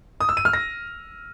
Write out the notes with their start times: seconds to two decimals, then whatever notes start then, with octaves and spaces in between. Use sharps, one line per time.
0.20 D#6
0.29 E6
0.37 D#7
0.45 F6
0.53 A#6